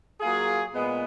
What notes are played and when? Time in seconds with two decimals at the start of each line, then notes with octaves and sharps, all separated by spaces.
0.21 F#3 A#3 F4 G#4
0.74 A#2 G#3 B3